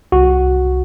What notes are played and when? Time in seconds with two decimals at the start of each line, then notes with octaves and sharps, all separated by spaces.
0.12 C2 F#4